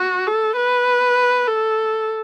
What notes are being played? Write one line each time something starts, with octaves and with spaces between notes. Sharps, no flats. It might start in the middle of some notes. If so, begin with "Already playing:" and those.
Already playing: F#4
A4
B4
A4